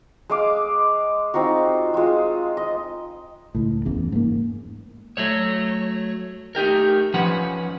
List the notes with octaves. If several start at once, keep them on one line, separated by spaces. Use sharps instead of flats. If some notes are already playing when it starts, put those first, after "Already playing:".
G#3 F5 D6
C4 D#4 F4 F#4
G#3 F4
D#5
C#2 A2
F#1 E2 C#3
G#2 A#3
F#3 A3 C#5
A3 D#4 G4 A#4
F3 C#4 B4 F#5